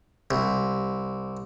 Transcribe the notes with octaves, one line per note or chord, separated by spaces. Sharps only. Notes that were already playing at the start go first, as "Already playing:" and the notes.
C2